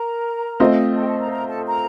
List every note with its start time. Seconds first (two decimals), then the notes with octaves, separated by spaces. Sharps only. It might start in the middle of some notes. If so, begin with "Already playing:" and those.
Already playing: A#4 A#5
0.60 A3 C4 F4 C5 D#5
0.95 A4 A5
1.01 G5
1.07 A4 A5
1.19 A#4 A#5
1.30 A#4 A#5
1.48 A4 A5
1.66 A#4 A#5